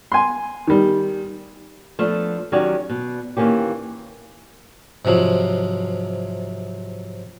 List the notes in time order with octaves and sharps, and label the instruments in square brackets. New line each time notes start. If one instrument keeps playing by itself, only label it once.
[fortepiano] G#5 C6
D#3 G3
[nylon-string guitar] F3 A3 B3 D4
D#3 F#3 C#4 F#4 G4 D5
B2
D#3 E3 F#3 A#3 C#4 G4
[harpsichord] G#2 C3 F3 F#3